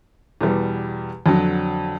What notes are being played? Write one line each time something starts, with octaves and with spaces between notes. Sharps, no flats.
E2 B2 G3
F2 D3 F#3